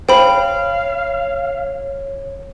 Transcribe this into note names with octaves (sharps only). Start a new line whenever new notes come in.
C5 C#5 F5 G5 B5